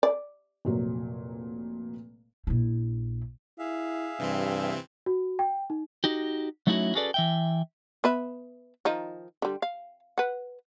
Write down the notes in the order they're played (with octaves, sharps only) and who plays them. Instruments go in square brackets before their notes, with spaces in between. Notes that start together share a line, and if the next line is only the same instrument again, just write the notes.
[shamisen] D5
[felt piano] F1 A#2 F#3
[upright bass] A#1 E4
[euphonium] E4 [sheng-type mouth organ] G#4 E5 F5
[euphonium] G2 [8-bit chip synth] C3 E3 C4
[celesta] F#4
G5
D#4
[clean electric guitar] D#4 F#4 G4
F#3 A3 C#4 D#4 E4 F#4
C#4 F#4 G#4 A4 B4 D5
E3 E5 G5
[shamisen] B3 B4 E5
D#3 F3 D#4
D3 G3
F5
B4 F#5